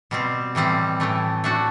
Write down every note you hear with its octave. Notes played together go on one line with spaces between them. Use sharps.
B2 G3 C4
A2 E3 G3 C4
A2 E3 A3
A3 D4 F#4